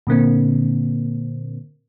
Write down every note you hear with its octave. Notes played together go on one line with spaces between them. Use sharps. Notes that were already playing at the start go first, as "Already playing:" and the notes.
A#2 D3 A#3 C4